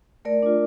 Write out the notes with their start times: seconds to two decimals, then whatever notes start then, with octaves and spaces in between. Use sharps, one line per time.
0.25 A3 A#4 D5
0.42 D4 F4